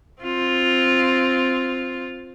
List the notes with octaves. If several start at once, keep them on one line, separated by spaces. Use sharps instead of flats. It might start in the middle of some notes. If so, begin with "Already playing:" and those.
C4 F4